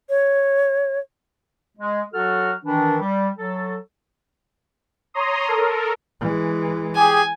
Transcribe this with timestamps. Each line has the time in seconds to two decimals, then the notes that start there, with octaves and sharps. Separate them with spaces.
0.10 C#5
1.78 G#3
2.14 F#3 F#4 A4 F6
2.65 D#3 E3 D4
3.01 G3
3.38 F#3 A4
5.14 C#5 A#5 C6 D#6
5.48 A4 A#4
6.21 E3 G#3
6.96 G4 G#4 G#5